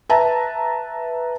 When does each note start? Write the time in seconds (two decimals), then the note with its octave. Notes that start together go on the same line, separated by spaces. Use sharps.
0.09 B4 E5 A5 A#5